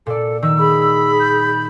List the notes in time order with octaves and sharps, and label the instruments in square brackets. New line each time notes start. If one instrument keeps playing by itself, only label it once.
[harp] A#2 D5 [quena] A4
[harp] D#3 [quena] E6
[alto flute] G#4 [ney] B5
[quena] G6